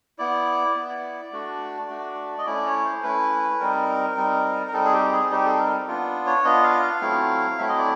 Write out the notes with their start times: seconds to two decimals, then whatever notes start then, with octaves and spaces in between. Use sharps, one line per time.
0.19 B3 E4 D5
0.75 B3 E4
1.32 A3 D4 F#4
1.90 A3 D4 F#4
2.38 D#5
2.46 A3 C#4 E4 D5
2.65 C#5
2.84 C5
3.03 A3 C#4 E4 B4
3.60 G3 C4 D#4 A#4
4.17 G3 C4 D#4
4.68 A#4
4.73 G3 C4 D#4 A4
4.85 G#4
4.93 G4
5.12 G#4
5.31 G3 C4 D#4 G4
5.45 A4
5.59 A#4
5.88 B3 D4 F4
6.26 C#5
6.44 B3 D4 F4 D#5
6.63 F5
6.83 F5
7.01 F#3 A3 C4 E4
7.58 F#3 A3 C4 E4 E5
7.69 D#5
7.79 D5